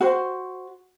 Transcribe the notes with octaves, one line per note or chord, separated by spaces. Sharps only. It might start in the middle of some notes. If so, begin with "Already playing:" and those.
F#4 C5